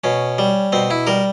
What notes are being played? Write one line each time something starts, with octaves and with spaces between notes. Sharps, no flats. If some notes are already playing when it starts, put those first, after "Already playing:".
B2 C#4
G3
B2 C4
E4
G3 A#4